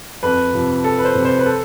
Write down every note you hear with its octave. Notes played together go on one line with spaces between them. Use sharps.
F2 B4
C3 F3
F2 A4
B4
C5
C3 F3
C5
B4
A4